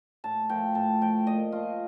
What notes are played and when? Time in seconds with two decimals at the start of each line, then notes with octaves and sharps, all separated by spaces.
0.24 A2 A5
0.49 F3 A3 G5
0.75 A2 A5
1.01 F3 A3 G5
1.27 A#2 D#5
1.52 A3 F4